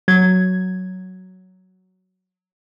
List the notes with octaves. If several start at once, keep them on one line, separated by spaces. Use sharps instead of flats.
F#3 G#6